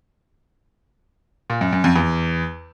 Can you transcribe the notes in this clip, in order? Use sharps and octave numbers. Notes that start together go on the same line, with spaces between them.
A#2
F#2
F#2
F2
E2